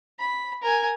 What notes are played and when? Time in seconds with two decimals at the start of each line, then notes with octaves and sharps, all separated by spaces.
0.19 B5
0.62 A#4 G#5